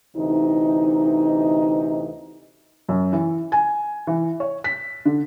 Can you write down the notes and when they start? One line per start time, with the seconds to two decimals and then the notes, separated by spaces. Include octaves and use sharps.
0.16 D2 C3 E3 D#4
2.89 F#2
3.13 E3
3.52 G#5
4.07 E3
4.40 C#5
4.64 B6
5.05 D3